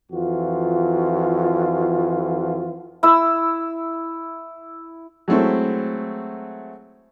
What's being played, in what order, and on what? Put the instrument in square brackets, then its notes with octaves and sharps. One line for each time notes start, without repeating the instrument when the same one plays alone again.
[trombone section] F2 E3 F4 F#4
[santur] E4 E6
[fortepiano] F#3 G#3 A3 C4 E4